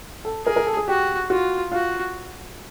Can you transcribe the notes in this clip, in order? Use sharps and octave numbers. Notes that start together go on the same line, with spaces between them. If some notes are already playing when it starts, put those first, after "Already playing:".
A4
G#4 A#4
A#4
A4
G#4
F#4 G4
F4 F#4
F4 F#4